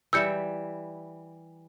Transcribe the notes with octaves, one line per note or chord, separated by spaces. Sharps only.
E3 G3 E5 E6 G6 C#7